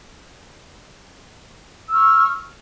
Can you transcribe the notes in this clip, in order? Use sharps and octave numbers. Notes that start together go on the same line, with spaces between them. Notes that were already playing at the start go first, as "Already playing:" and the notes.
C#6 E6 F6